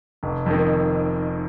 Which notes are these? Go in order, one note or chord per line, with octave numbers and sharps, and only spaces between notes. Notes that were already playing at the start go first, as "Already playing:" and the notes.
F1
F2 D#3